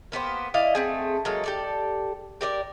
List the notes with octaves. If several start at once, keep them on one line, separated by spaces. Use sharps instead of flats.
A#3 B3 G4 C5
E4 D5 D#5 F5
A3 C4 G#4
F#3 G#3 A#3 A4
G4 A4 D5
G4 A#4 D5